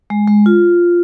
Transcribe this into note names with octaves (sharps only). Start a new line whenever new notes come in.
G#3
G#3
F4